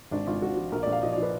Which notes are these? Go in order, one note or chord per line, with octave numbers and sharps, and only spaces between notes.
G#1 D4
G#1 F4
G#1 F#4
F3
A#1 A#4
D5
A#1
F5
F3 D#5
D5
F3 B4